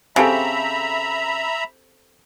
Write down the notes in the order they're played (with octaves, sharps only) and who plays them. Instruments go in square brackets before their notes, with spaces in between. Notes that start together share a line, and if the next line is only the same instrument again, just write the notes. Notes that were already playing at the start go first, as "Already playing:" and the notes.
[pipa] C#3 [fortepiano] C4 G4 A4 [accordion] E5 A#5 B5